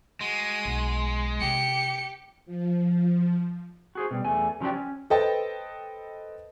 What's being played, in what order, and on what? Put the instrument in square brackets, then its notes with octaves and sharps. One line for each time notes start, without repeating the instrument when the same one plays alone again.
[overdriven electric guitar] G#3 [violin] F#4 D#7
[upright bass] B1
[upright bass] C3 [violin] G4 [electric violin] C#7
[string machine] F3
[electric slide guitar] F#4 G#4 C5
B2 G3
E2 A3 G#5
C#3 F3 F#3 D4 G4
C#4
[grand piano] A4 B4 C5 D#5 G5 A5